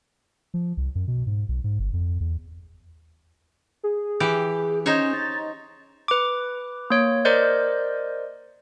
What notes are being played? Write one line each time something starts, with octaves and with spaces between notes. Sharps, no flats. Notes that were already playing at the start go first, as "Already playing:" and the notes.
F3
C2
F#2
B2
G#2
B1
G#2
G1
F2
E2
G#4
E3 G4
C#4 D#4 C5 C#5
A6
B4 D6
A#3 C#5
A#4 C5 D5 D#5 G6